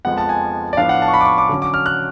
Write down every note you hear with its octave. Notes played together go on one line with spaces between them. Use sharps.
F2 F3 G#3 B3 F#5
A5
G#5
D5
A2 F3 B3 D4 F5
F#5
A5
C#6
B5
D6
C#6
D6
D3 F#3 C#4
D6
F6
F#6